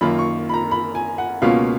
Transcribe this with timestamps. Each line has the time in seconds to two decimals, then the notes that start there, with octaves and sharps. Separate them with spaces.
0.01 F#2 D#3 A#3 F4 B5
0.19 C#6
0.49 B5
0.54 A#5
0.71 B5
0.95 G#5
1.18 F#5
1.42 C#2 B2 A#3 C#4 F4 F5